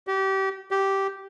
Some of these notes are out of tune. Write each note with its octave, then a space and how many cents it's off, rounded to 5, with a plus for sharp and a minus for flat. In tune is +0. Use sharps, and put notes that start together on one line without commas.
G4 -30
G4 -10